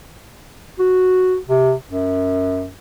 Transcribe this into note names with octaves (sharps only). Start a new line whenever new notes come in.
F#4
C3
F#2